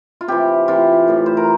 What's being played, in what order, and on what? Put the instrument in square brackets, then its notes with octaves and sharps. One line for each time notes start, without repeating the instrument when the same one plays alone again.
[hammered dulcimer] F4
C3 E3 G4
C3 E3 F4
A2 E3
C5
A#4